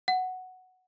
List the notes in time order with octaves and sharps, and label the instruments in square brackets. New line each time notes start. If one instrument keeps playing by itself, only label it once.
[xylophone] F#5